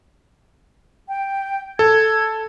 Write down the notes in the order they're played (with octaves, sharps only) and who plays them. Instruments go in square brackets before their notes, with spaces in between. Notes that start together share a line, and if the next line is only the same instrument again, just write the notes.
[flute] G5
[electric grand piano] A4 [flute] G#6